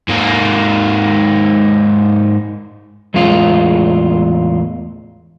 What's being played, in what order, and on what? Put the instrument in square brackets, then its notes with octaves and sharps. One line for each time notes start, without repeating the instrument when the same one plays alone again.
[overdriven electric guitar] G#2 A#3
[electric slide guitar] E2 A2 G#3 F4